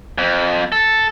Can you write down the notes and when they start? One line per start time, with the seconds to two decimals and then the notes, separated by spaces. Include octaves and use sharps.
0.18 F2
0.72 A4